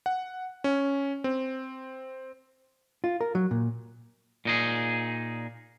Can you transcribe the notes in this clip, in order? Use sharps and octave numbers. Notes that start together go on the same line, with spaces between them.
F#5
C#4
C4
F4
A#4
F#3
A#2
A#2 D#4 G#4